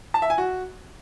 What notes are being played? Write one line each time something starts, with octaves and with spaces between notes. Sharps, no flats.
A5
E5
G#5
F#4